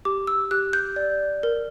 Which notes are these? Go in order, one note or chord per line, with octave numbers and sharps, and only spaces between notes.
G4 D6
E6
G4 F#6
G6
D5
A#4